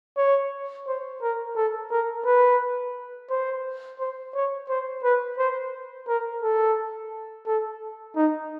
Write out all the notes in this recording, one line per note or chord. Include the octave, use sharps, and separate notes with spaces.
C#5
C5
A#4
A4
A#4
B4
C5
C5
C#5
C5
B4
C5
A#4
A4
A4
D#4